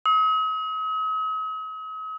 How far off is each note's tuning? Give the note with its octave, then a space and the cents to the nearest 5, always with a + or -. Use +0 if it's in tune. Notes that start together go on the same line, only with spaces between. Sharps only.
D#6 +45